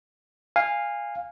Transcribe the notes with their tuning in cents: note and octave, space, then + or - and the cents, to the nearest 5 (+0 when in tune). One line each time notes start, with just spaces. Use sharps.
F5 +0 G#5 -20